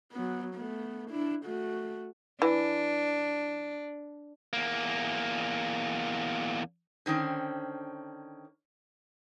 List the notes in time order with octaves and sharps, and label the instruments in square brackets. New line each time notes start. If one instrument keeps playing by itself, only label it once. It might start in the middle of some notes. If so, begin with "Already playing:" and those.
[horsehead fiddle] F#3 B3
A3 B3
D4 E4
A3 F#4
[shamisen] E3 [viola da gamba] D4
[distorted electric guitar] E2 A#3
[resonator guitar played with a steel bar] D3 D#3 C4 C#4